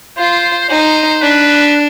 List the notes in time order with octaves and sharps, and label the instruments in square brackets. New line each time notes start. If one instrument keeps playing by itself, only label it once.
[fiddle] F4 [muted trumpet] C5
[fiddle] D#4 [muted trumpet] C5
[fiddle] D4 [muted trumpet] B4